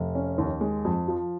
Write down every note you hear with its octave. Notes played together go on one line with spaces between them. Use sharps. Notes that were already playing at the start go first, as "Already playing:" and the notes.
Already playing: F1
C#4
D#2
G#3
F2
F3